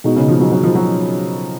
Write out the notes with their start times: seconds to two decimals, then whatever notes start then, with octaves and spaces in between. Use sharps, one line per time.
0.04 B2 G#3 D#4 F#4
0.16 C#3
0.28 F3
0.40 F#3
0.52 F#3
0.63 F3
0.75 F#3